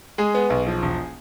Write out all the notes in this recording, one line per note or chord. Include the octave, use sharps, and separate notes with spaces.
G#3 G#4
B3
B1
F3
E1